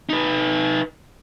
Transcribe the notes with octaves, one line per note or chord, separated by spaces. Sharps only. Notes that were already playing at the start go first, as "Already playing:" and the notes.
D#4 B4